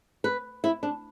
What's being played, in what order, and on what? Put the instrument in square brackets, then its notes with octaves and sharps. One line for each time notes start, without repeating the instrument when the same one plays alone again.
[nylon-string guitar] B4
E4
D4